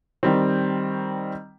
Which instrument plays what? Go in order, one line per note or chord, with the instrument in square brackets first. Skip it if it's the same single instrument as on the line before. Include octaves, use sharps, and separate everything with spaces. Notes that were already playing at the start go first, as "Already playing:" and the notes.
[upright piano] D#3 G3 C4